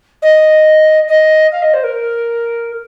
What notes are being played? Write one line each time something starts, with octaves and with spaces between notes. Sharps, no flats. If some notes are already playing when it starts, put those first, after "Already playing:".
D#5
D#5
F5
D#5
C5
A#4